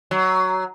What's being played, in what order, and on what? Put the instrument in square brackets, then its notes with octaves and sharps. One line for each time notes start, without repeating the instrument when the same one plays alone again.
[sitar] F#3